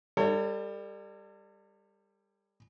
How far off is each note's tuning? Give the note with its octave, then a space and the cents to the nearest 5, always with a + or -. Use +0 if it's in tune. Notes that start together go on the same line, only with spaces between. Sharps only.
G3 +25 A4 +45 C#5 +0